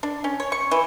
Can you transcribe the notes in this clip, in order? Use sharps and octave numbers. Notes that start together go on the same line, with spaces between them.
D4
C#4
C#5
C#6
E3